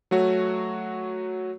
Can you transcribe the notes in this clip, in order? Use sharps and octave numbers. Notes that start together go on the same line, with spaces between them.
F#3 A3 F#4 C#5